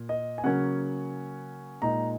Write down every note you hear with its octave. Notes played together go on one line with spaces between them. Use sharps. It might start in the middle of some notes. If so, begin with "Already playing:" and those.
Already playing: A#2
D#5
G#5
C#3 F#3 A#3 C#4 F#5
A#2 G#3 D#4 A#5